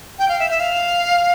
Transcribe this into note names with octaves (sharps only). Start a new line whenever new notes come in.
G5
F5
E5
E5
F5